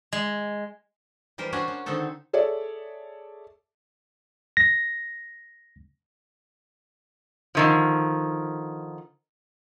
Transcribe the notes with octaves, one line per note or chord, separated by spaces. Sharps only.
G#3
E3 G3 A#4 C5
C#4 D4 F#4 C5 F#5 G#5
C#4
D3 D#3 C4 D#4 A4
G#4 A4 C#5 D5 E5
A#6
D3 D#3 F3